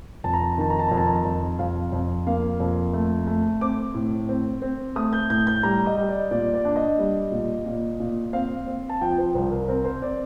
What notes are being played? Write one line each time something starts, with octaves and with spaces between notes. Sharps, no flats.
F2 A5
A#5
A5
A#5
D#3 A5
A#5
A5
F2 A#5
A5
A#5
A5
F2
F2 F5
F2
A#3 F5
F2
A3
A3
C4 D6
A2
C4
C4
A3 D#6
G6
A2 G6
G6
G3 A#5
D#5
G3
D#5
D5
A#2 D5
D5
D4
D#5
G3
A#2
A#2
A#2
C4 F5
C4
A5
F3 G5
C5
C2 C5
A#4
C4 A#4
C5
C4 D5